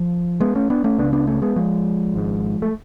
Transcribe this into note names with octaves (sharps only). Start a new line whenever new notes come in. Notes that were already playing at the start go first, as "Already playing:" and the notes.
Already playing: F3
G#3 B3
A3 C#4
B3 D4
A3 C#4
C#2 C#3 B3 D4
B3 D4
A3 C#4
G#3 B3
F3 G#3
G#1 G#2
A3